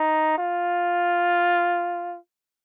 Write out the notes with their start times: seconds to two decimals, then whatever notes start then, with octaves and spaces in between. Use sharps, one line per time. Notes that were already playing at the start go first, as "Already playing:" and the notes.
Already playing: D#4
0.38 F4